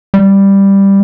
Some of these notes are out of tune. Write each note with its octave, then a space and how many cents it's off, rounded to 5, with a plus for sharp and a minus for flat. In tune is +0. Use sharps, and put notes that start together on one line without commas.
G3 +5